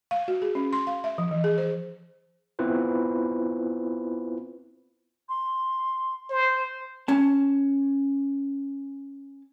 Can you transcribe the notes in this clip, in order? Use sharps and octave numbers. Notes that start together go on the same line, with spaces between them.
F5
F#4
G#4
C#4
C6
F5
E5
F3
E3
G#4
C5
B3 C4 E4 F4 B4 C5
C6
C5
C#4 A5